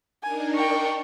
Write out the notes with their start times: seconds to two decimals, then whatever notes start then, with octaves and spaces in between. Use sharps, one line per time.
0.23 D4 D#4 A#4 G#5
0.55 G5 C#6